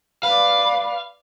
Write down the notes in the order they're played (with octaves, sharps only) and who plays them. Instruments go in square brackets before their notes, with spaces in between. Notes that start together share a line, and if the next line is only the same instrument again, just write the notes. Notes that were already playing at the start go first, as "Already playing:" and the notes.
[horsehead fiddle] B4 D5 [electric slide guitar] F5